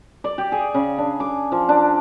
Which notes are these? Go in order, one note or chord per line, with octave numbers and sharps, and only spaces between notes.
D5
G4
G#4
C#3
D4
D6
F3
D4